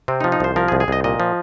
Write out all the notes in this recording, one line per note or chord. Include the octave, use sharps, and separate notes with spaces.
C3 C4
D#4
F3
D#4
C2 C5
F3 A#4
G#4
C2
G#4
C2 D#5
A#2 D#5
F3